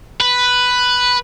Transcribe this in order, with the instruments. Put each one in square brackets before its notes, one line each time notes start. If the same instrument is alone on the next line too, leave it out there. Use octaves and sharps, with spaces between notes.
[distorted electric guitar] B4